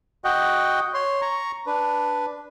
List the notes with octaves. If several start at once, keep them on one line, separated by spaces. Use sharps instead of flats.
F#4 D#5 F#5 G5
C#5 C6
A#5 C#6
D4 B4